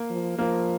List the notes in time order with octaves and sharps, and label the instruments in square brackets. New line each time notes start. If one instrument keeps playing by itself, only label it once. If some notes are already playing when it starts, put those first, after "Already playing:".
Already playing: [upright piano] A#3
[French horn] F3
[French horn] F3 [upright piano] A#3